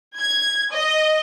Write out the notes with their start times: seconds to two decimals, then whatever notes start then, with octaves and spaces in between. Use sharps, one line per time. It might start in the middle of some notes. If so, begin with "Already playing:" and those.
0.18 G#6
0.73 D#5